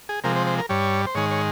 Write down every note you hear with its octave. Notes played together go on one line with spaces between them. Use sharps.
G#4
C3 F3 G#3 A#4
C5
C5
A#4
G2 G3 C#5
C5
G#2 D#3 G#3 C#5
C#5